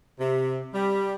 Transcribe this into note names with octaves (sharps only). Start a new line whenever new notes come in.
C3
G3